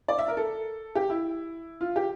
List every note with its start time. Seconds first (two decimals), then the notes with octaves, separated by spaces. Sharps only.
0.08 D5
0.18 E5
0.28 A#4
0.37 A4
0.95 G4
1.10 E4
1.81 F4
1.96 G4